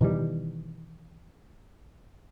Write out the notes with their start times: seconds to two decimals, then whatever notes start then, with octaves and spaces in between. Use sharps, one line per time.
0.01 B2 D#3 E3 G3